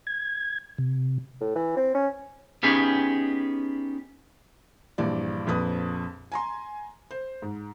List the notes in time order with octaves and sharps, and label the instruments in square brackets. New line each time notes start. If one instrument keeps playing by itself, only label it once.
[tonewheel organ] G#6
C3
[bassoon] A2
E3
C4
C#4
[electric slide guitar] B3 C#4 D#4 G4 G#4
[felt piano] A#1 G2 E3 D5
A#1 F2 B4 D#6
G#5 A#5 C6
C5
G#2